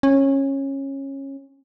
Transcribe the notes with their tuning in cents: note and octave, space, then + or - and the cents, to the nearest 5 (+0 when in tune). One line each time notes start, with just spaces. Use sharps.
C#4 -20